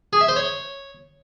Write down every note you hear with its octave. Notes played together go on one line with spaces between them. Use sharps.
G#4
E5
C5
C#5